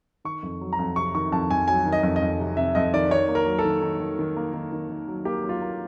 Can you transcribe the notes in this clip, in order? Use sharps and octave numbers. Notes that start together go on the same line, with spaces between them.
D#3 C#6
F2
F#3
A#5
F2
C3 C#6
D#3 C#6
F2 A5
F2 G#5
F#3 G#5
D#3
D#5
F2
D#5
F2
C3
C3 E5
F2 D#5
D#3 D5
D#3 C#5
A#3
A#4
F#3
A4
D#3
D#3
D#3
D#3
A#3
D#3
D#3
D#3
F#3
A#3 G4
F#3
F4
A#3